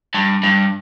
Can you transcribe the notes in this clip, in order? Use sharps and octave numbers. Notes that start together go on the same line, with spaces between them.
G2
G2